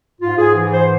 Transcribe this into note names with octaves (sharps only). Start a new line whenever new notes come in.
G#2 F4
G#4
E3
C5